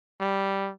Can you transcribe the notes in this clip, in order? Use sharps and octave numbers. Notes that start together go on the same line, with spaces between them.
G3